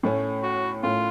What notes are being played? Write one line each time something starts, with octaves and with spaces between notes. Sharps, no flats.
A2 A3 C#4
F#4
A2 A3 C#4 F4